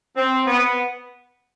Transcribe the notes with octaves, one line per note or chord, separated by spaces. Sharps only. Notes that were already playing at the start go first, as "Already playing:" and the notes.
C4
B3